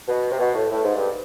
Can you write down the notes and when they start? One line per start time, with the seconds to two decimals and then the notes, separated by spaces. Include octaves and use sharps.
0.08 B2
0.31 C3
0.40 B2
0.55 A2
0.71 A2
0.84 G#2
0.96 G2